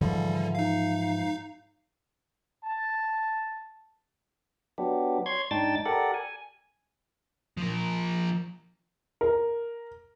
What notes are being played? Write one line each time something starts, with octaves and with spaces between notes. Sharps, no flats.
G#2 D3 E3 F3 G3
D#4 F5
A5
F#3 B3 D4 G4
C#5 C6 G#6
G#2 D4 D#4 G5 A5 A6
G4 A4 A#4 D5 F#5
G#5
F3 A#4
A#4